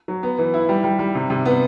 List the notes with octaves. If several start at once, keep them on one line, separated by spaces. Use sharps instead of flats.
F#3
B3
E3
E4
G3
G3
G3
C3
C3
B3